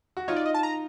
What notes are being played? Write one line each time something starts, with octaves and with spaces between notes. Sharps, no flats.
F#4
D#4 F4 C#5
D5
D#5
A5
A#5